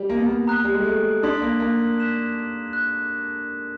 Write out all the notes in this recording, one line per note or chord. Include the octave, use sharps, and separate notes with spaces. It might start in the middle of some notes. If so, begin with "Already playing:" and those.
Already playing: G3
A#3
B3
A#3
A#5 D#6 F#6
G3
G#3
A3
D4 A5 C6 D#6 G#6 B6
A#3
A#3
F#6 B6 E7
F#6